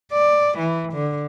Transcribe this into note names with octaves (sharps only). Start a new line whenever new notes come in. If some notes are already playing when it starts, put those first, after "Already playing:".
D5
E3
D3